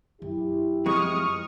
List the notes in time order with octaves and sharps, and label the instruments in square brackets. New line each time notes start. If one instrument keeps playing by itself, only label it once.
[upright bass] F#2 [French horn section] E4 G4
[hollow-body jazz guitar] F2 G#3 [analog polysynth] C#6 D#6 F6